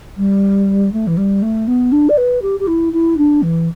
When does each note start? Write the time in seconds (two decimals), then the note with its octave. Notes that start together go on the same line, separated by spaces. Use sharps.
0.18 G3
0.93 A3
1.07 E3
1.17 G3
1.42 A3
1.67 B3
1.92 D4
2.09 D5
2.17 B4
2.42 G4
2.60 G4
2.67 E4
2.93 E4
3.17 D4
3.42 E3